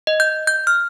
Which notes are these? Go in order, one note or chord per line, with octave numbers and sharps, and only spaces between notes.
D#5
G6
G6
F6